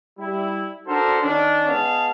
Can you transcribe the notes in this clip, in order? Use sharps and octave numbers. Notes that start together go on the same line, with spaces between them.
G3 E4
D4 F#4 A4 A#4 C5
D#3 C#4 D4
G#3 B3 G#4 F5 A5